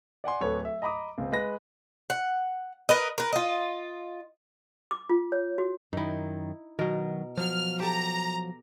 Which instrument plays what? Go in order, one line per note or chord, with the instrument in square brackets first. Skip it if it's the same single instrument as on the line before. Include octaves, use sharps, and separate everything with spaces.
[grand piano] D5 F#5 G#5 C6
D1 A4 B4 C#5
E5
D#5 A#5 B5 D6 D#6
C#2 C4
G#3 B4 B5 A#6
[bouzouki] F#5
A#4 B4 D#5
A#4 B4
F4 D#5
[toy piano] D6
F4
C#5
F#4
[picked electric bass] F#2 D#3 [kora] D#4 E4
[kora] B2 A#4 [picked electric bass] D#3 F#3
[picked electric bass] F3 F#3 [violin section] F6
[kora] G4 A4 [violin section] A#5